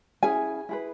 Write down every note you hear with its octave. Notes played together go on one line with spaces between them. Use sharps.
C#4 E4 G#4 G#5
E4 G#4 B4